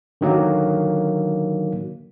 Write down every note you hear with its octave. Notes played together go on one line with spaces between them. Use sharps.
D3 D#3 F#3 A#3